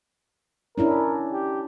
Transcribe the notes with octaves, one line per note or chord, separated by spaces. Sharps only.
C#4 D4 E4 A#4
G4